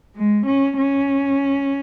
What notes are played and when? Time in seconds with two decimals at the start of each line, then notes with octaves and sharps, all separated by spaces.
0.14 G#3
0.46 C#4
0.77 C#4